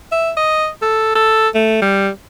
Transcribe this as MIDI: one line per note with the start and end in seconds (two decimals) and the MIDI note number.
0.12 0.32 76
0.37 0.69 75
0.82 1.11 69
1.16 1.48 69
1.55 1.78 57
1.82 2.10 55